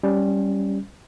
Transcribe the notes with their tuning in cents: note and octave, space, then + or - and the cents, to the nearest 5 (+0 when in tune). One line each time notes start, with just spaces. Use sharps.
G3 +0 C#4 +0